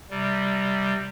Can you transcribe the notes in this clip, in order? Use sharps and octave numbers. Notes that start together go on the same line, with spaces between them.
C3 G3